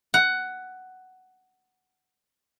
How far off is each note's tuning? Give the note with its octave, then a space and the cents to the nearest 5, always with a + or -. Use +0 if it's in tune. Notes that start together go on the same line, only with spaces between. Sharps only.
F#5 +10